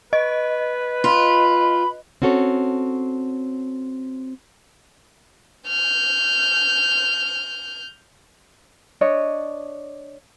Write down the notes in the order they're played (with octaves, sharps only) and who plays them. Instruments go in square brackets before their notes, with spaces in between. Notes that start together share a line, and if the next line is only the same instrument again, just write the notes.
[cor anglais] B4 [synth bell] D#5
[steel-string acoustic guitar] F4 [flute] B5
[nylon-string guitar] C4 C#4 F#4 A4 C#5
[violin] F6 G6
[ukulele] D4 C#5 D#5